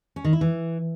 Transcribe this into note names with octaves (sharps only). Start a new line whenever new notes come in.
C#4
D#3
E4
E3